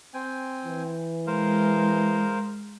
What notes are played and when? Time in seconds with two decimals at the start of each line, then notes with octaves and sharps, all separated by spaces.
0.14 C4 G5 G#5
0.64 E3
1.27 G#3 A#4 C5 F5